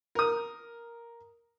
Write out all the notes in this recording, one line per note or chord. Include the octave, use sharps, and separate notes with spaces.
A#4 D#6